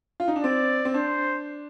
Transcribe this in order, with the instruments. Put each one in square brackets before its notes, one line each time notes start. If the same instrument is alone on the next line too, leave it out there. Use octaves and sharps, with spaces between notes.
[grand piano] F4
D#4
D4
[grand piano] C4 [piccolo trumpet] D5
[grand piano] C4
[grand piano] D4 [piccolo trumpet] C5